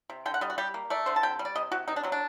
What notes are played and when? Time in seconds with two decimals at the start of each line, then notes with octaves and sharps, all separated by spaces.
0.10 C3
0.26 D3 G5
0.34 F#5
0.41 G3 D#5
0.50 F#4
0.58 G3 G4
0.74 A#3
0.90 A3 D5
1.06 D3 C5
1.16 A5
1.23 C3 G5
1.39 G3
1.45 D5
1.56 C3 D#5
1.72 C3 F#4
1.88 C3 D#4
1.96 D4
2.03 F#3 C4
2.12 D4